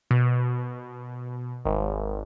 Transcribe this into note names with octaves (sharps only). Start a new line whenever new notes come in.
B2
G#1